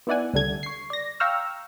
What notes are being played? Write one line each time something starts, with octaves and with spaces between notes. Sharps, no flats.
B3 D#4 E4 D5 F#5 G#5
C#2 D3 G3 A4 G#6
C#6 C7
D5 A#6
F5 G5 A#5 C#6 E6 F6